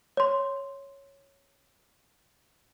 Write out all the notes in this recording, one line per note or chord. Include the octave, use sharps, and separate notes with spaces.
C#5 C6